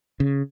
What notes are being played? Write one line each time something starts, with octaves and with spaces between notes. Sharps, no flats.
C#3